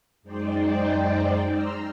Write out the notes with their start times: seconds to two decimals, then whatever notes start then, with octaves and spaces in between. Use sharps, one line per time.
0.22 F#2 G#3 D#4 C5 D5 G5
1.45 A#5 C6 E6 F6